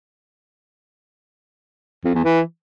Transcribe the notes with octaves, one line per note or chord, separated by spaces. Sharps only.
F2
E2
E3